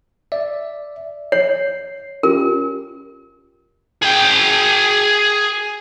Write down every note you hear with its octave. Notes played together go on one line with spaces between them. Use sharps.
D5 E5
C#5 C7
C#4 F4 G4 A#4
G#4 G5